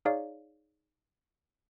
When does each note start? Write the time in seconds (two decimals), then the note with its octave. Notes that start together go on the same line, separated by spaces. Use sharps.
0.05 D#4 G#4 C#5 D5 F5